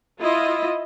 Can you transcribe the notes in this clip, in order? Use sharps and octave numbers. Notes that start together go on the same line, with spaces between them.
E4 F4 D#5